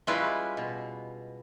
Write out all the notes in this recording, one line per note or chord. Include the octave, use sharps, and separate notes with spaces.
G3 G#3 C#4 E4 F4 B4
B2